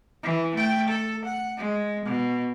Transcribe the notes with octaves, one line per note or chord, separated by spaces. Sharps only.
E3
A3 G5
A4
F#5
G#3
B2